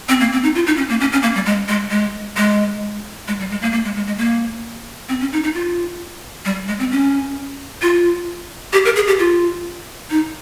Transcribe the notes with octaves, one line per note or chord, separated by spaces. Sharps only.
C4
A#3
C4
D#4
F4
D#4
C#4
A#3
C#4
C#4
A#3
G3
G#3
G#3
G#3
G#3
G#3
G3
G#3
A#3
A#3
G#3
G#3
G#3
A#3
C4
C#4
D#4
D#4
F4
G3
G#3
C4
C#4
F4
G4
A#4
G#4
G4
F4
D#4